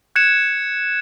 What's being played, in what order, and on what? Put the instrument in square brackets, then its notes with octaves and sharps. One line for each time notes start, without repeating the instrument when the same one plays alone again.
[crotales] F#6 G#6 C#7 E7